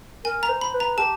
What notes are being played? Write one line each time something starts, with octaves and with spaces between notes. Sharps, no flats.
A#4 G#5
A#5
C5
B5
B4
A#5
G4 A5